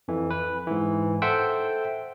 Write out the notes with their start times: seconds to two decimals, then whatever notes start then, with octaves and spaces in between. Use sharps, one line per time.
0.08 F2 E3
0.30 B4
0.67 G#2 E3
1.22 A4 C5 E5 F#5 G5